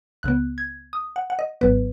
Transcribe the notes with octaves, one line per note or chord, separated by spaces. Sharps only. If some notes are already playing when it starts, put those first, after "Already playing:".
C#2 C#3 B3 F#6
G#6
D#6
F#5
F#5
D#5
G#1 G#2 F#3 B3 B4